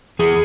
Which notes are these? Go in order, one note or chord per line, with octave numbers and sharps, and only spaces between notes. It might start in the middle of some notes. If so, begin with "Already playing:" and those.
E2 G#4